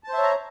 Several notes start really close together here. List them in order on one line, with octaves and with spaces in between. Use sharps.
A5 C5 E5 C#5 A#5